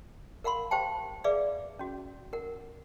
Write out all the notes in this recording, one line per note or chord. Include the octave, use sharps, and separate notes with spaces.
A#4 F5 F#5 B5 C6
G4 C5 F5 G5 A5
G#4 B4 D5 E5 F5
C#4 F#4
A#4 F#5